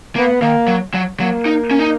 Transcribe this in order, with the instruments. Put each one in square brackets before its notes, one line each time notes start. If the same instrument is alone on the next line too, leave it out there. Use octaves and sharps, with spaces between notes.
[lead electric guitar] A#3 [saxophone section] B3
[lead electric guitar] D#3 [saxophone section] A#3
[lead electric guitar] F#3
F#3
[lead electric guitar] F#3 [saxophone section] A#3
[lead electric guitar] D#4
C#4
D#4